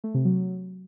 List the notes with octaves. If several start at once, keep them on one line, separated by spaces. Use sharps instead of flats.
A3
C3
F#3